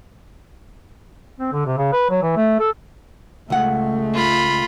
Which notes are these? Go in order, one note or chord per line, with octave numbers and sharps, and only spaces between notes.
C4
D3
C3
C#3
B4
F#3
E3
A3
A4
C#2 G#3 A3 F#5
F4 B5